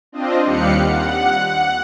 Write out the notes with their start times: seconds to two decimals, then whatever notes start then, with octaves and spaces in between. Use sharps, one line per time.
0.12 C4 D4 F4 D#5
0.44 D#2 G3 G4 F5 F#6 C#7
0.83 F#5
1.37 F#5